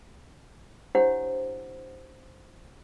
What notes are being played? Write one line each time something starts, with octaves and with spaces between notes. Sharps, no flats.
D4 E4 G4 C5 C#5 F#5